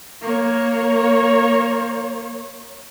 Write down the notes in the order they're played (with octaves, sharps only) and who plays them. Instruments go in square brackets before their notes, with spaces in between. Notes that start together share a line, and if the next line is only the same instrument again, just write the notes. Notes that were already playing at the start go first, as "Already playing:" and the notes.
[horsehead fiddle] A#3 C#5